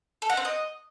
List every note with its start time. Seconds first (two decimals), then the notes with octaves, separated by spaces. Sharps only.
0.22 A4
0.30 F#5
0.37 C4
0.45 D#5